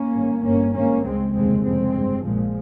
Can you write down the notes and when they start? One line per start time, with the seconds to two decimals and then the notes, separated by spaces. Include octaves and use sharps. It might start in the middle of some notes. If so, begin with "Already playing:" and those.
Already playing: A#3 C#4
0.14 G#1 G2
0.44 G1 G2 A#3 C#4
0.73 G#1 G#2 A#3 C#4
1.03 C#2 C#3 G#3 C4
1.33 F1 D#2 C#3 G#3 C4
1.63 F1 F2 C#3 G#3 C4
1.93 G1 G2
2.23 A#1 A#2 F3 G#3